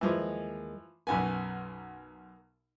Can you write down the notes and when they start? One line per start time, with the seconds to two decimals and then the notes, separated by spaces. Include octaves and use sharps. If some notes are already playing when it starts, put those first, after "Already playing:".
0.01 D#2 E3 F3 G#3
1.07 B1 F#2 B4 F#5 G#5